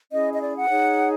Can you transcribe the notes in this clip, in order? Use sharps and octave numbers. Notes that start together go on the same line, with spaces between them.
C#4 E4 G#4 D#5
D#5
D5
F#5
D#4 G#4 C#5